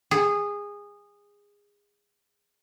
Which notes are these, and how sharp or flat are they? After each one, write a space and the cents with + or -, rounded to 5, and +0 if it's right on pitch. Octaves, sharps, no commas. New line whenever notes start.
G#4 -20